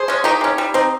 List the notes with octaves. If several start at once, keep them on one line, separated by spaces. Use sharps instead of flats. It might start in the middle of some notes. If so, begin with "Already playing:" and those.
Already playing: G#4 C5
G#3 C#4
D#3 D#4 G4
G#3 C#4
G3
C4 D#4